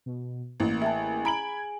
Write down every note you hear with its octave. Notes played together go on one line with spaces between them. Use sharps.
B2
A1 A#3
G#4 E5 G5 A5
A#5 B5 G#6 D7 F#7